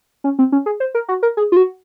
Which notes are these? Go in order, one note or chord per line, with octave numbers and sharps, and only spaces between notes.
C#4
C4
C#4
G#4
C5
A#4
F#4
A#4
G#4
F4
F#4